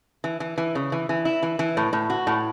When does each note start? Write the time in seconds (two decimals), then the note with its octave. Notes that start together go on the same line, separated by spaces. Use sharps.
0.24 E3
0.40 E3
0.58 E3
0.75 C#3
0.92 E3
1.09 E3
1.25 E4
1.43 E3
1.59 E3
1.77 A2
1.93 A2
2.10 F#4
2.27 A2